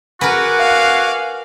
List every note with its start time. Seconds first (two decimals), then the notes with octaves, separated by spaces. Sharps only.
0.21 F#4 A#4 B4 F#5 G#5 D6
0.58 F5